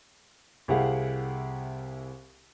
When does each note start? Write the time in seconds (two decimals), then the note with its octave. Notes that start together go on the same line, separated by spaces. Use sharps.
0.68 C2 E4 G4 G#4 F5 F#5